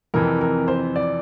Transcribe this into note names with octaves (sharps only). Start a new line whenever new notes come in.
F2 C3 E3 A#4
A#4
C5
D5